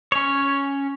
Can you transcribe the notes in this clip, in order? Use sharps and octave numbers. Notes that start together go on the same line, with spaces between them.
C#4 C#5